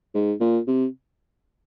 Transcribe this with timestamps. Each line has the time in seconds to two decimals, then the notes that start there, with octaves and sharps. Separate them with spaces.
0.14 G#2
0.40 A#2
0.67 C3